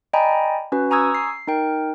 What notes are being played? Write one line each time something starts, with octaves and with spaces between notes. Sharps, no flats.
D5 D#5 G5 G#5 A#5 B5
C#4 F#4 B4
G#5 A#5 C#6 D#6 E6 G#6
C7
D#4 A#4 G5